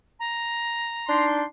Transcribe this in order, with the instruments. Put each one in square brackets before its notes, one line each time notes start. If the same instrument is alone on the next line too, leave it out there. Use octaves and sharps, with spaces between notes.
[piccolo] A#5
[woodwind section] D4 D#4 C6